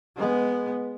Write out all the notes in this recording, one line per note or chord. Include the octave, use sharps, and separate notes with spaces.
G#3 B3